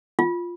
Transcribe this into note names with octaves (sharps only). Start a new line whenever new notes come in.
F4